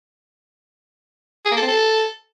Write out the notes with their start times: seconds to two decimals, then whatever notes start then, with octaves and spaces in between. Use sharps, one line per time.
1.46 G#4
1.51 A#3
1.57 A4
1.62 C4
1.67 A4